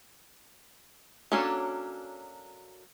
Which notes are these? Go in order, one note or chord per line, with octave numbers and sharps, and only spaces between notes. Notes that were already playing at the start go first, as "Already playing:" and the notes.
F#3 A#3 C#4 D4 A4